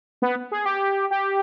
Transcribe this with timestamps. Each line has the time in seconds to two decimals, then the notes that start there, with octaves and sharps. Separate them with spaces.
0.22 B3
0.52 G#4
0.66 G4
1.11 G4